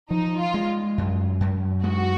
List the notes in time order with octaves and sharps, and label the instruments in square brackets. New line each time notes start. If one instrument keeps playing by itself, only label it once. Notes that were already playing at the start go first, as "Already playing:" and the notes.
[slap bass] F3 [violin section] D#4
[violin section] F4
[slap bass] G#3
F#2
F#2
[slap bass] G#3 [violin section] F#4